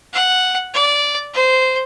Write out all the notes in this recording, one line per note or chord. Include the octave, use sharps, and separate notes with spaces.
F#5
D5
C5